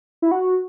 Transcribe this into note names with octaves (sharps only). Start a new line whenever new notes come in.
E4
F#4